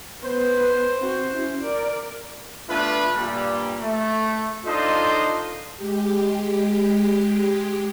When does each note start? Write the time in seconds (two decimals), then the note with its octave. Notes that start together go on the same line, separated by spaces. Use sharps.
0.23 B3 B4 C5
0.99 C4 F#4
1.32 C#4 E4
1.62 A#4 D5
2.69 A3 B3 D4 F4 B4
3.14 G2 A#2 G3
3.80 A3
4.64 D4 D#4 F4 A4 C5 D#5
5.77 G#3 G4